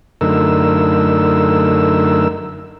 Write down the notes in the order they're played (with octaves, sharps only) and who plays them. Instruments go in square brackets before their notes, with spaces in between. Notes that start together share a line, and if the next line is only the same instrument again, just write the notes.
[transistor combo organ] F#2 D3 A3 D#4 A#4 E6